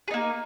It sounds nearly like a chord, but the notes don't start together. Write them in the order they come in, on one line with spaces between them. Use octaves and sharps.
G#4 D#4 A#3